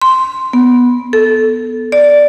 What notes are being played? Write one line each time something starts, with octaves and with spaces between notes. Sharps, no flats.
C6
B3
A4
D5